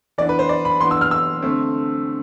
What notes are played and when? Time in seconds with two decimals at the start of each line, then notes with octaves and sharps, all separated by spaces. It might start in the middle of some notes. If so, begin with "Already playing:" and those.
0.18 E3 B3 D4 D5
0.29 B4
0.39 C5
0.49 D5
0.65 B5
0.81 E3 B3 D4 C6
0.91 E6
1.01 F6
1.11 E6
1.42 D3 A3 C4